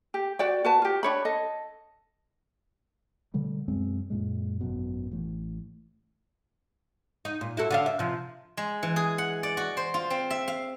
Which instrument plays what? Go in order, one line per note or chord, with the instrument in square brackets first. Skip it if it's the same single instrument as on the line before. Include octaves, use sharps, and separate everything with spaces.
[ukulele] G4
F#4 D5 G5
F#4 B4 A5
F4 G4
D4 C#5 B5
A4 D#5
[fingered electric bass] B2 D3 G3 A3
F#2 B2 G#3 C4
F#2 A#2 G#3
G#1 F#2 B2
A1 A2
[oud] D#4
A#2
E4 F#4 A4
D3 D4 F5
E5
C3 F3
[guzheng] G#3
E3
G#4
F#5
D5
F#4
C5
F4
C4
E5
F5